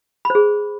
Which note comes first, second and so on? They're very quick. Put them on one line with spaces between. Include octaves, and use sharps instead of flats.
B5 C5 G#4